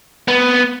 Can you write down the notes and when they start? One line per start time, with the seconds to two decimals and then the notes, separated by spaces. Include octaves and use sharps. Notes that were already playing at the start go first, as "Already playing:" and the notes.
0.28 B3